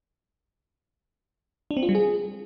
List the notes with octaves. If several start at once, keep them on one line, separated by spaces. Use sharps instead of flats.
D4
C4
F4
G3
G#4